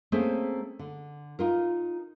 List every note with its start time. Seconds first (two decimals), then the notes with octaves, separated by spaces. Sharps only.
0.12 A3 A#3 C4 C#4 G#4 C5
0.79 D3
1.39 D#4 F4 A#4